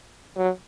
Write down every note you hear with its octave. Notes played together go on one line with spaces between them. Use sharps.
F#3